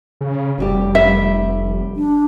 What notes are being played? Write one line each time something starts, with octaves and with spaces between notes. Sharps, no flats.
C#3
F1 C3 G3 G4
G3 A3 E5
D4